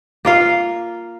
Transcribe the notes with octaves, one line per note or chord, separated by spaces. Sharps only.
A#3 F4 F5